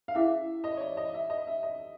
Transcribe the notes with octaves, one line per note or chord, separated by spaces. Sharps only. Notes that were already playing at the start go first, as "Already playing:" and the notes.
F5
C#4 E4 G#4 E5
D#5
C#5
D5
D#5
E5
D#5
E5
D#5